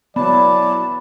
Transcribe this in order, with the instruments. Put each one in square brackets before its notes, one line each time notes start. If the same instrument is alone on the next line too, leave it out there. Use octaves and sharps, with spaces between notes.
[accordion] E3 F#3 A5 [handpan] B3 [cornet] D5 [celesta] B5